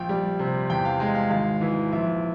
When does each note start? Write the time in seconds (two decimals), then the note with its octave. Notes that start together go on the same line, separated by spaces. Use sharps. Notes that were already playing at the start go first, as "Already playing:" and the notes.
Already playing: A#1 G5
0.09 G3
0.39 C3
0.69 E2 G5
0.85 F5
0.99 G#3 F5
1.15 F5
1.30 G#1 F5
1.61 E3
1.92 A#1 E5